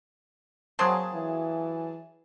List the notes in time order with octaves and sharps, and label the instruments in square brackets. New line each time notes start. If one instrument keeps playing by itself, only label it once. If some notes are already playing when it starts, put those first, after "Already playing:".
[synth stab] F#3 G#4 A5 [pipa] A#3 C4 C6
[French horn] E3